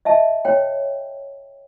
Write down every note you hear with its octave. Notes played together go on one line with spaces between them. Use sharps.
D#5 E5 A5
C#5 G5